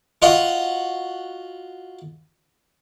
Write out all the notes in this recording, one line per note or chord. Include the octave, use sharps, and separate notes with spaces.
F4 F#4 D#5 F#5